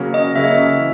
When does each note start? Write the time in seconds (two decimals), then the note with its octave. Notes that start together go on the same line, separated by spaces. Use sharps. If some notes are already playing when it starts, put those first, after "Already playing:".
Already playing: C#3 F#3 A#3 C#4 G#4
0.14 D#5
0.36 C#3 F#3 A#3 C#4 G#4 E5
0.77 E3